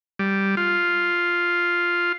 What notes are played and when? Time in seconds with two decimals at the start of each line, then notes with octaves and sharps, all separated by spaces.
0.19 G3
0.57 F4